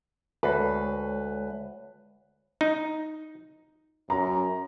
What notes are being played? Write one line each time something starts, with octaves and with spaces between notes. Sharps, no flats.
D2 G#3 B4 C#5
D#4
F#2 A#5